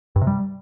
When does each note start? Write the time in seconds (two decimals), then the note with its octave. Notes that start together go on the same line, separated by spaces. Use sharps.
0.16 G2
0.21 C3
0.27 G3